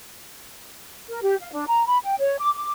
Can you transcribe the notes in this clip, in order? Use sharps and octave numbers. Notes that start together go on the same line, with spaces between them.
A#4
G4
F5
D4
A#5
B5
G5
C#5
D6
D6